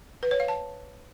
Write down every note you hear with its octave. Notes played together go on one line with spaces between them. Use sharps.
B4
C#5
F5
A5